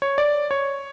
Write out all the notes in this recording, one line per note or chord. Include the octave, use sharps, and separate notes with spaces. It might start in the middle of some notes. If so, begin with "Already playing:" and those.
C#5
D5
C#5